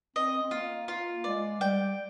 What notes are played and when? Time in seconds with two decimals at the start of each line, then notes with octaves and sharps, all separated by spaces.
0.16 C4 D#5
0.42 C4
0.51 A#3 F4
0.88 F4
1.24 G#3 D5
1.60 G3 G5